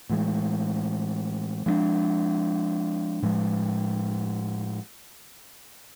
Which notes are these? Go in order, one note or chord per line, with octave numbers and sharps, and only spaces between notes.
A2 E3 G#3
F3 G#3 B3 D4
A2 F3 G#3